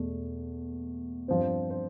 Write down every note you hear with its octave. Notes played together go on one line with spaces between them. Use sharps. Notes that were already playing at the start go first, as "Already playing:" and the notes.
Already playing: E2 B2 A3
G2 F3 C4 C5
C5